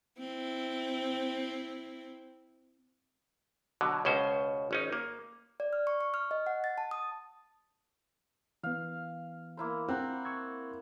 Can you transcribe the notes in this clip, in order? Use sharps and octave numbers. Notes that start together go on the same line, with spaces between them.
C4 E4
B2 D3 F#3
C#2 B2 C#4 C5
G#1 C#4 D#4
A#3
D5
F6
C#6
C#6
F6
D#5
F#5
A6
A5
D#6
E3 B3 F5
A#3 E4 C5
C4 F#5 A#5
C#6 E6 G#6